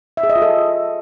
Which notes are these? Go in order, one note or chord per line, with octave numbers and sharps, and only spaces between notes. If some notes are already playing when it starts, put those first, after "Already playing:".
E5
G#4
D#5
F4
A4